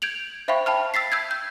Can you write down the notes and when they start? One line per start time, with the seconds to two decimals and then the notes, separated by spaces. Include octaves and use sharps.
0.02 G6 G#6 D7 F7 F#7
0.48 C5 E5 F5 G5 B5 C#6
0.66 G5 A5 B5 F6
0.94 E6 A6 B6 C7
1.12 E6 G6 G#6
1.31 G6